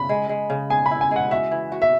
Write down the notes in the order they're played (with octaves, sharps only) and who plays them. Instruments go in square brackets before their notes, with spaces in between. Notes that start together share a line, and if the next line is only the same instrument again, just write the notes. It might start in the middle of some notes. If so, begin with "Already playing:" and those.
Already playing: [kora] C#3 [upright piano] B5
[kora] G#3
G#3
C#3
[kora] G#4 [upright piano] G#5
[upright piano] B5
[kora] E4
[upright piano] G#5
[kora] G#3 [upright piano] F#5
[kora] F#4 [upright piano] E5
[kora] E3
F#4
[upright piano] E5